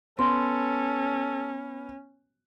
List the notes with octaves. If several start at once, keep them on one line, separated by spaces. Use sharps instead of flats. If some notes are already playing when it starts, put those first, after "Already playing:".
B3 C#4 A4 C6